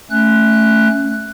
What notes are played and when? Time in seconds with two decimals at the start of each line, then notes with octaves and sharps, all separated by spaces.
0.11 A3 C#4 F#6